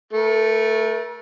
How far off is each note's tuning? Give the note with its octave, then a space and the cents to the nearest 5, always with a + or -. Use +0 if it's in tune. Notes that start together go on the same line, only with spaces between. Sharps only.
A3 +0 A#4 +40